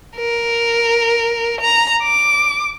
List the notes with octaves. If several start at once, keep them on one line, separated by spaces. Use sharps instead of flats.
A#4
A#5
D6